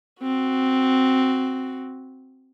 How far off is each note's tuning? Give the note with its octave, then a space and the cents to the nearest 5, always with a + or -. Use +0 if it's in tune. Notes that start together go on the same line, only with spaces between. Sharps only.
C4 +0 F#4 +5